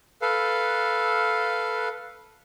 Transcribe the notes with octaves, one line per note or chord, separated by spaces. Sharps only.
A4 B4 F5